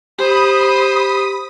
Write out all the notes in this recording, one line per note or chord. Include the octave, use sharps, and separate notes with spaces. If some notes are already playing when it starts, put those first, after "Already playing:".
G4 C5 B5 D#6